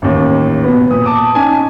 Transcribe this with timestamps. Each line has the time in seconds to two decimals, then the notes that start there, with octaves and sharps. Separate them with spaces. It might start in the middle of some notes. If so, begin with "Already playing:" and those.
0.02 A1 D#2
0.64 B2 B3
0.91 A#2 D#6
1.05 A5 D6 D#6
1.35 C#4 D#4 G#5 A5